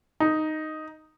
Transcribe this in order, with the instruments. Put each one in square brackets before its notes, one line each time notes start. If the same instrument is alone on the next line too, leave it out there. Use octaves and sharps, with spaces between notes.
[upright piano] D#4